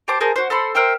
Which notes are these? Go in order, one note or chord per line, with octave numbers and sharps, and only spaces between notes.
G4 C5 A5 D6
G#4 A#4 C5 A5
F#4 C5
A4 C5 B5 C6
A#4 C5 E5 G5